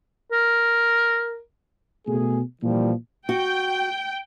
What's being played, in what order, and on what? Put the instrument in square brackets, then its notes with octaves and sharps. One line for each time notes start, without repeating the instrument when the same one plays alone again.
[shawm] A#4
[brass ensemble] B2 A3 G#4
A#2 E3 F3 G3
[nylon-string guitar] F#4 [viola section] G5